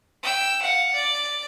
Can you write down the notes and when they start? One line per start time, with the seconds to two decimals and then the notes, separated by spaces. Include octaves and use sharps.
0.23 G5 E6
0.62 F5 F#5
0.94 D5